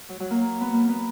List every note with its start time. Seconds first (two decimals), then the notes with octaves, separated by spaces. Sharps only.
0.09 F#3
0.20 F#3
0.31 A#3
0.61 B3
0.73 A#3
0.89 B3